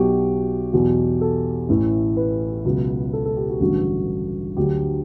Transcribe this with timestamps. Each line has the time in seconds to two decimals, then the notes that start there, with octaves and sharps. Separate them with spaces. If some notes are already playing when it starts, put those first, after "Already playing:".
Already playing: B1 B2 F#3 F#4 G4
0.73 E2 B2 F#3
1.21 A4
1.69 A1 A2 E3
2.17 B4
2.65 C#2 B2 F#3
3.13 A4
3.25 A4
3.37 G4
3.49 F#4
3.60 A1 G2 D3 F#3 F#4
4.56 D2 D3 F#3 G4